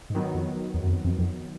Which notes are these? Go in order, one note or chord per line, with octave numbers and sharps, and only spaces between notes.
G#2
G2 D#3 F#3 B3
F2
E2
F#2
F2
F2
F2